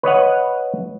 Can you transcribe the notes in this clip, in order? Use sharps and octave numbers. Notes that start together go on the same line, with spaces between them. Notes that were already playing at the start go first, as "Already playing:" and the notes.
B4 C#5 D#5 F#5